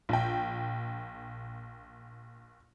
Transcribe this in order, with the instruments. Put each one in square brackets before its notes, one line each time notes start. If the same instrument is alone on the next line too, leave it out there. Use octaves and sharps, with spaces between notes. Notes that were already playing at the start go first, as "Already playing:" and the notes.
[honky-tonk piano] A#1 G5